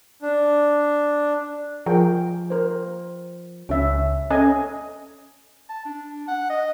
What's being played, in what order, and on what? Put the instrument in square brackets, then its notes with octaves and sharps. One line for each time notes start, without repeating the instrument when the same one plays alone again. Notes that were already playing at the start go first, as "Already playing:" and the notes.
[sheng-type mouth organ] D4
[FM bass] F3 [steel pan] G#4 A#4 G5
[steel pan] A#4 C5
[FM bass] C#2 [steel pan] C#4 E5
[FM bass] C#4 [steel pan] A4 D#5 G#5
[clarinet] A5
D4
F#5
D#5